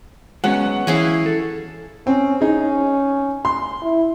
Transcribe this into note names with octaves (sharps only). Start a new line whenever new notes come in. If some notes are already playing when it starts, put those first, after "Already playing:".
F#3 G#3 B3 C#4 F#5
E3 C#4 E4 G#4 F5
A4
C4 C#4
C#4 D#4 G#4
C6
E4